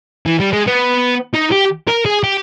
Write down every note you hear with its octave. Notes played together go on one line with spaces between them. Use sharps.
E3
G3
G#3
B3
D#4
G4
A#4
G#4
G4